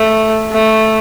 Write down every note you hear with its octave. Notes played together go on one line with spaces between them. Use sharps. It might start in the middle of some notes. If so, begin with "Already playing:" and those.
Already playing: A3
A3